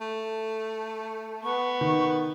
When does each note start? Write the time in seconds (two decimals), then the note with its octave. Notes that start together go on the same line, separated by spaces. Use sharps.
0.01 A3
1.43 B3 C#6
1.81 D#3